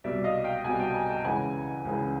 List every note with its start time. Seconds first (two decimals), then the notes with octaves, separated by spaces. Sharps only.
0.04 C2 B2 G3 D5 E5
0.24 D#5 F5
0.44 F5 G5
0.64 C2 B2 G3 F#5 G#5
0.79 G5 A5
0.94 G#5 A#5
1.09 G5 A5
1.25 C#2 C#3 E3 F#5 G#5
1.85 C#2 C#3 E3